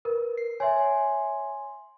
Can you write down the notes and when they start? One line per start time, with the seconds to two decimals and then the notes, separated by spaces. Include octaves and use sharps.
0.05 A#4 B4
0.38 C7
0.60 C#5 E5 G#5 C6